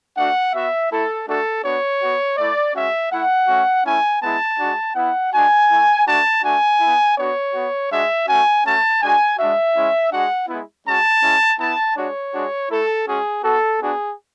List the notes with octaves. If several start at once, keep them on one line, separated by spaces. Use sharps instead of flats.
A3 D4 F#4 F#5
B3 F#4 E5
A3 E4 A4
A3 D4 F#4 A4
B3 D4 F#4 C#5
B3 F#4
A3 E4 D5
G#3 C#4 F#4 E5
A3 E4 F#5
A3 C#4 F#4
A3 C#4 E4 G#5
G#3 B3 E4 A5
G#3 D4 F#4
B3 E4 F#5
G#3 D4 F#4 G#5
A3 E4
A3 D4 F#4 A5
A3 D4 F#4 G#5
B3 E4
B3 D4 F#4 C#5
B3 F#4
G#3 D4 F#4 E5
A3 C#4 F#4 G#5
A3 C#4 F#4 A5
G#3 D4 F#4 G#5
G#3 D4 F#4 E5
G#3 C#4 E4
G#3 D4 F#4 F#5
G#3 B3 E4
G#3 C#4 F#4 A5
G#3 C#4 E4
B3 E4 A5
G#3 D4 F#4 C#5
G#3 D4 F#4
A3 E4 A4
G#3 C#4 F#4 G#4
B3 F#4 A4
B3 D4 F#4 G#4